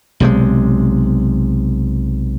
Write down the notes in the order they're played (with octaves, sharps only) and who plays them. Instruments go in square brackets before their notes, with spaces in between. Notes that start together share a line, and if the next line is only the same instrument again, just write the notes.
[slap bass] B1 C3 F#3 G#3